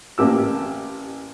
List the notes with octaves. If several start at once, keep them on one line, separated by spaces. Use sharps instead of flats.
A1 A#3 G4 E6